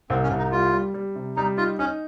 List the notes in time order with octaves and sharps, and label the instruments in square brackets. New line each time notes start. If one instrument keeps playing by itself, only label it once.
[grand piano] C2 [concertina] C4
[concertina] C#4
[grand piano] C2
[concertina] D#4
[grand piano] G3 [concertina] F4
[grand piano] G3
G3
C3
[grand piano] G3 [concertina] D#4
[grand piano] D#4 [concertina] F4
[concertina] C#4 [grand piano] D#4